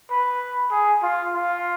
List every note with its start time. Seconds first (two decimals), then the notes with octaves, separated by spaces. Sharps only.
0.11 B4
0.71 G#4
1.03 F4
1.34 F4